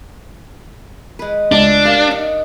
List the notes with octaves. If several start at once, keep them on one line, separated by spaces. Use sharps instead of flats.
G#3 B4
C#2 A3 D4
G4 A#4 F5 F#5
D#4 F#5 D6